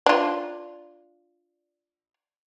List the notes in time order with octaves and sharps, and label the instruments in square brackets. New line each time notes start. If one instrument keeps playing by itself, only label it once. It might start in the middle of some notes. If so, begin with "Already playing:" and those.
[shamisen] D4 F4